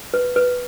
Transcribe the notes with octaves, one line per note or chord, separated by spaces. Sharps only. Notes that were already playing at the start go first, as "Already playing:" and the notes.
B4
B4